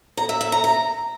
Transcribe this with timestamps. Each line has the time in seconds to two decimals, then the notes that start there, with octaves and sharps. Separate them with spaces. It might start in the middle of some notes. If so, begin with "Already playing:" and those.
0.17 A#5
0.29 E5
0.41 E5
0.52 A#5
0.64 A#5